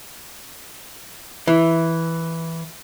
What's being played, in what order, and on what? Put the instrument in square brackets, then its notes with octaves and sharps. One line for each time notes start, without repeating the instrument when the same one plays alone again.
[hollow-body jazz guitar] E3